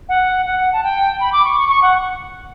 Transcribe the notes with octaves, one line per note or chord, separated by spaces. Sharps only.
F#5
F#5
A5
G5
B5
D6
C#6
C#6
C#6
F#5